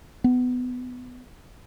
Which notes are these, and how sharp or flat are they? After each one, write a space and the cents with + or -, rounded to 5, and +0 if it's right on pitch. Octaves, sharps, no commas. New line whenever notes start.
B3 +20